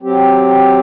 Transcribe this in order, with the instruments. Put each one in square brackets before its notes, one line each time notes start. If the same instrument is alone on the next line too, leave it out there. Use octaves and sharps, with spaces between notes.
[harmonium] F#3 C4 G4